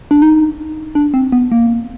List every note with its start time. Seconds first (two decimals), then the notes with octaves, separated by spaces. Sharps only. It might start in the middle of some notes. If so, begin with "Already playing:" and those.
0.11 D4
0.22 D#4
0.95 D4
1.14 C4
1.32 B3
1.52 A#3